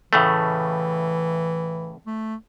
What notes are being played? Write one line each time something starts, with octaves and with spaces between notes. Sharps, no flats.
A2 C#3 E3 A3
A3